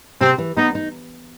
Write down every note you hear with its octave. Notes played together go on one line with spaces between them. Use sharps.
C3 C4
E3
B3 D#4
D#4